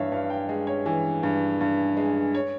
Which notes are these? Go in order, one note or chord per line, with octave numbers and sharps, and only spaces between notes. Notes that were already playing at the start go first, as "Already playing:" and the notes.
Already playing: G2 E3 C#5 E5 F5
G2 F5
G5
G#3
C#5
E3
G2
G2
G#3
C#5